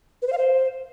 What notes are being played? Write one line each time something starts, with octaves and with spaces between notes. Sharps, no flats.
B4
C5
F5
C5